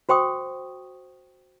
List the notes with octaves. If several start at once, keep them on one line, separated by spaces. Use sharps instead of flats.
F#4 C5 G5 C#6 D#6